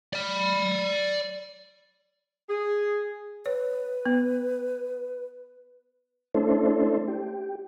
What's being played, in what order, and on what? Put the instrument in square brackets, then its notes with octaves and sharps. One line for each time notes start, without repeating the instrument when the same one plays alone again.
[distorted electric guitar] D5 B5
[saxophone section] G#4
[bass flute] B4 [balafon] C#5
[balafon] B3
[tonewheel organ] A3 C#4 D4 E4 A4 C5
G4